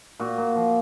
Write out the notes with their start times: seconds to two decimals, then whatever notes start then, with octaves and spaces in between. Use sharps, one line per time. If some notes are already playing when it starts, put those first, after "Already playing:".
0.20 A#2 F#4
0.38 A#2
0.56 F3